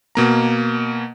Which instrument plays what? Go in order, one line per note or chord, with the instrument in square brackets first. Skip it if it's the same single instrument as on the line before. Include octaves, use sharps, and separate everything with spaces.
[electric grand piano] B2 A#3 A#5